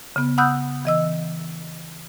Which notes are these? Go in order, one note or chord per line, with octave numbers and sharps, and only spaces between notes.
C#3 B3
F#5 B5 D#6 E6 F#6 G6
E3 D#5 E6